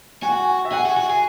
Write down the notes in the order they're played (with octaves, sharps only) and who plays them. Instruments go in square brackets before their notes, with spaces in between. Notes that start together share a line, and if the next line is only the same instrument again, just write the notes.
[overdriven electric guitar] F#4 [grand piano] G#5
[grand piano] F#5
G#5
E5
[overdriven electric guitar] G#4 [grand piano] F#5
[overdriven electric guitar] F#4
[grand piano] G#5
[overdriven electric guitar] F#4
[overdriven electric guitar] G#4 [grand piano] G#5